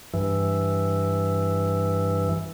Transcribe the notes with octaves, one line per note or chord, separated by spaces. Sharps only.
G2 E3